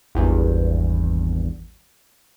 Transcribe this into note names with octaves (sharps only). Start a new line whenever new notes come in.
G#1 E2 G2